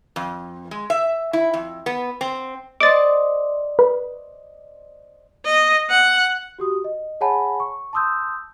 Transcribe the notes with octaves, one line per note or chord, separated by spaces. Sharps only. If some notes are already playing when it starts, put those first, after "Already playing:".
F2
G#3
E5
E4
F2
B3
C4
C5 D5 D#5 D6 A6
B4
D#5
F#5
F#4 G4 D#6
D#5
G#4 C#5 F#5 G#5 A5 B5
C#6
A5 C6 D#6 E6 G6